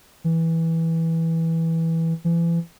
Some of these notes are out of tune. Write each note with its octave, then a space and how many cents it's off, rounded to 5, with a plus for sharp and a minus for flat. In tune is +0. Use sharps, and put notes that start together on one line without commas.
E3 -10
E3 +35